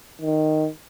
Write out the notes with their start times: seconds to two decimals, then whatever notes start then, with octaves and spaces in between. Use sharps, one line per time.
0.21 D#3